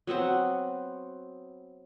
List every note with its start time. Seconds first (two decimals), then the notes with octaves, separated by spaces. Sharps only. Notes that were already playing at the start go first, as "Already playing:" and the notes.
0.07 F#3 B3 C4 F#5